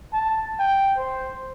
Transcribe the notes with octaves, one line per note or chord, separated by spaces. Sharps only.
A5
G5
C5